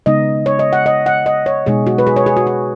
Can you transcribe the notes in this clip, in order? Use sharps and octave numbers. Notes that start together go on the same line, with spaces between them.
C#3 G#3 B3 D#4 D#5
C#5
D#5
F#5
D#5
F#5
D#5
C#5
B2 G#3 D#4 G#4
F#4
B4
G#4
C#5
G#4
F#4
G#4